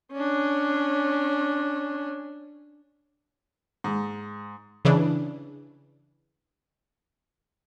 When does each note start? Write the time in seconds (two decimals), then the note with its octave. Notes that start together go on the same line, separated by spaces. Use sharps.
0.12 C#4 D4
3.84 G#2
4.85 C#3 E3 D4